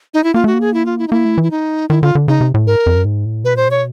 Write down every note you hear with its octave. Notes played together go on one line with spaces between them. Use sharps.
D#4
E4
A#3 F4
A3 F#4
A#3
G#4
E4
F4
E4
D#4
A#3 E4
A3
E3
E4
D#4
D#3 E4
D3 F4
D3
C#3 D#4
C3
A2
G#2 A#4
F2
F#2
G#2
A2
B2 B4
A#2 C5
B2 C#5